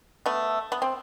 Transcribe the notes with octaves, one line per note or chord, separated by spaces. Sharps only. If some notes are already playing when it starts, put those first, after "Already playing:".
A3 B3
B3
C4